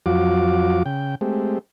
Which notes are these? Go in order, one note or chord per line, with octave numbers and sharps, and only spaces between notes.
F2 F#3 F4 F#4 D6
C#3 G5
G#3 A3 C4 G4